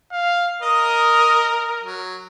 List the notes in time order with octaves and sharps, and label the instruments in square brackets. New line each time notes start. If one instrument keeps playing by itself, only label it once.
[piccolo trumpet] F5
[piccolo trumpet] A#4 [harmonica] D#5 D#6
[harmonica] F#3